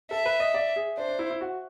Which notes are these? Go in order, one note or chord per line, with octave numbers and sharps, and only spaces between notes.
A4 E5
B4
D#5
D5
G#4
D4 C5
D4
E4
E4
F#4